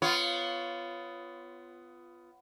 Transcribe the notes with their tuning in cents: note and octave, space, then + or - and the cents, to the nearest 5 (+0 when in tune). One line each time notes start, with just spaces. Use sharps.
B3 +15 F4 -10 C#5 +0